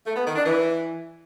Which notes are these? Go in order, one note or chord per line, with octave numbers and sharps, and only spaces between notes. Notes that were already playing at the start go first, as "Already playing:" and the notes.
A3
B3
D#3
D4
E3